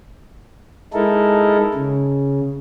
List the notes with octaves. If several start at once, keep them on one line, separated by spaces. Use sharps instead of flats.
G#3 D#4 E4 A4 A#4
C#3